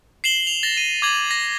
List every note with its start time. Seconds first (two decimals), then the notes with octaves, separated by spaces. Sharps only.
0.24 C7 E7 F#7 G7
0.47 F7
0.63 A6 A#6 G7
0.77 D#7
1.02 D6 G#6 F#7
1.31 A#6